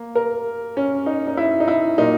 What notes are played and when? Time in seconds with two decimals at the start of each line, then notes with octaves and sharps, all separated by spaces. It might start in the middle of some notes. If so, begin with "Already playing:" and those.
Already playing: A#3
0.15 A#4
0.77 C#4
1.06 D#4
1.27 D#4
1.37 E4
1.60 D#4
1.68 E4
1.98 A#2 F#3 A#3 D#4